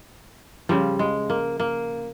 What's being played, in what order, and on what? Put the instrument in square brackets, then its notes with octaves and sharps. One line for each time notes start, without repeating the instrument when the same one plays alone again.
[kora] C#3 F3 G3
G#3
A#3
A#3